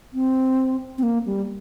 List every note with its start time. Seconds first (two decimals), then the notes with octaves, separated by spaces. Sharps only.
0.14 C4
0.98 C4
1.03 A#3
1.26 G3